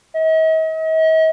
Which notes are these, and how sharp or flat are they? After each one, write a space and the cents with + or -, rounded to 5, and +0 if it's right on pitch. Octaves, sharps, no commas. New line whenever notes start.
D#5 +45